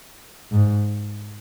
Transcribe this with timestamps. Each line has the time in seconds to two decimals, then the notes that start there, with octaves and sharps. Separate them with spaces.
0.52 G#2